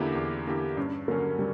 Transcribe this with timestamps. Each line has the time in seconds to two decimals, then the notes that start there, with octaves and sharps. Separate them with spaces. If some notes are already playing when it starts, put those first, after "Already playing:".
Already playing: E2 D3 A#3 C#4 E4 G4
0.15 E2
0.47 D3 A#3 E4 G4
0.77 G2 C#4
1.08 D3 F#3 A#3 C#4
1.39 G3